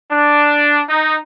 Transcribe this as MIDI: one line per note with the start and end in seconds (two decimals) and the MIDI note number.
0.12 0.81 62
0.89 1.18 63